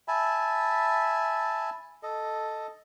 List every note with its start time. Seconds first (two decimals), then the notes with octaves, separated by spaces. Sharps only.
0.08 E5 G#5 A5 B5
2.03 A4 D#5